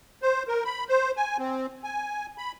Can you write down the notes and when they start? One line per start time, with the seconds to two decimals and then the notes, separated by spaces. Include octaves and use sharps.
0.22 C5
0.48 A#4
0.65 B5
0.89 C5
1.17 G#5
1.38 C4
1.84 G#5
2.38 B5